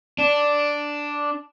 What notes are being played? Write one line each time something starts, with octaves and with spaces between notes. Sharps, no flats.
D4